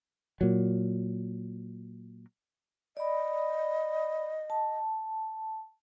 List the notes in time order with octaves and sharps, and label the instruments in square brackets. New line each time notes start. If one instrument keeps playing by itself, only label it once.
[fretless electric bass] A#2 F#3
[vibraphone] D5 B5 [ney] D#5
[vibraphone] A5